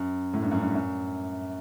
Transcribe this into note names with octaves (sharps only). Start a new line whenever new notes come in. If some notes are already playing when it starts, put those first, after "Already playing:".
Already playing: F#2
A2
G2
F#2
G2
F#2